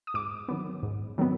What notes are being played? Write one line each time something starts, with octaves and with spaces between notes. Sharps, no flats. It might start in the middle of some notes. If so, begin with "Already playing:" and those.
D#6
G#2 D6
D#3 F#3 B3
G#2
D#3 F#3 B3